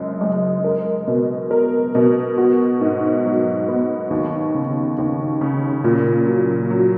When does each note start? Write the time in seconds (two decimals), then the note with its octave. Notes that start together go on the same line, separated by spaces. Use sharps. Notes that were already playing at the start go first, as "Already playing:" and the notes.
Already playing: F#1 F#2 G#3
0.21 G#3
0.64 A#4
1.07 B2
1.51 A#4
1.95 B2
2.38 F#4
2.81 G#2
3.25 F#3
3.68 B3
4.10 D#2
4.55 C#3
4.98 D#2
5.41 C#3
5.84 A#2
6.27 F#3
6.70 F#3